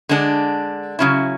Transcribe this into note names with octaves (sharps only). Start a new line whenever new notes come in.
D3 G#3 D4
C#3 F#3 C#4 E4